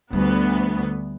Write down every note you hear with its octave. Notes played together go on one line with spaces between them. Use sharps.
D2 G3 B3